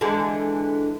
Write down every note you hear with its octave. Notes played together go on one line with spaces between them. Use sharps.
D3 E3 G#3